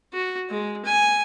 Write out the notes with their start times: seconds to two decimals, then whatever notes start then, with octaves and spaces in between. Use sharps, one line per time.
0.13 F#4
0.50 G#3
0.85 G#5